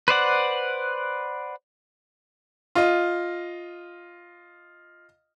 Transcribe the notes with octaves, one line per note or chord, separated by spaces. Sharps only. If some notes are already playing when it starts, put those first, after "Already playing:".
B4 C5 D5 F#5
F4 D#5